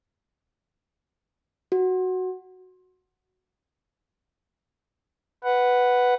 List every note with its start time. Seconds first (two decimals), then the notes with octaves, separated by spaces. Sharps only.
1.72 F#4
5.44 B4 F#5